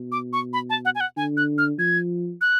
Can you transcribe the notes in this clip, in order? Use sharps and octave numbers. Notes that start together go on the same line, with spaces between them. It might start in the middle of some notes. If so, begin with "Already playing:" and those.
Already playing: B2
D6
C#6
B5
A5
F#5
G#5
F#5
D3 G#5
F#6
F6
F3 G#6
F#6